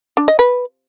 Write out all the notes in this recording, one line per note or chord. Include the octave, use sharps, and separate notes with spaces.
D4
D#5
B4